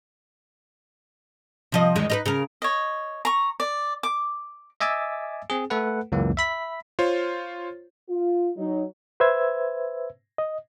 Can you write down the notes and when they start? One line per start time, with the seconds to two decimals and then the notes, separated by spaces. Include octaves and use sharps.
1.72 C3 F3 D#5
1.96 E2 D#3 G#3
2.10 D#4 A#4 B4
2.26 C#3 A#4
2.62 C#5 D#5
3.25 A#5 C#6
3.60 D5
4.03 D6
4.80 D#5 E5 G#5 D6 E6 A6
5.50 C4 G#4
5.70 A3 A4 B4 F#5
6.12 C#2 F#2 E3 A#3
6.37 E5 B5 B6
6.99 F4 C5 C#5
8.09 F4
8.57 F#3 D#4
9.20 B4 C5 E5 E6 G#6
10.38 D#5